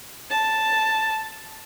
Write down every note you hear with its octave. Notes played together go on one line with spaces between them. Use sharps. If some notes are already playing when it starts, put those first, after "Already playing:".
A5